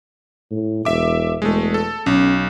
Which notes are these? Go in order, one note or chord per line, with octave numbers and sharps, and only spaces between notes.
A2
E1 E5 D6
E1 G#3 A3
A4
B1 C#4